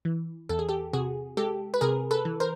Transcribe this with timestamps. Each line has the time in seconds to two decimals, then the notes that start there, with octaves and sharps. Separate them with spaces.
0.05 E3
0.49 E2 A4
0.59 G#4
0.69 G4 A4
0.93 C3 F#4 G#4
1.37 G#3 G4 A4
1.74 B4
1.81 C3 G#4 A#4
2.11 A4 B4
2.25 E3
2.40 A#4 C5